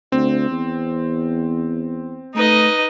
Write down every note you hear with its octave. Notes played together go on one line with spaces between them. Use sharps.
D2 C4
E2
A3 D#4 B4 D#5